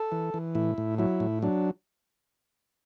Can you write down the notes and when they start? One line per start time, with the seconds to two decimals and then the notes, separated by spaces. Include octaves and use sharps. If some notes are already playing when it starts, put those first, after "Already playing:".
Already playing: A4
0.12 E3
0.34 E3
0.55 A2 E4
0.78 A2
0.99 F#3 E4
1.20 A2
1.42 F#3 D4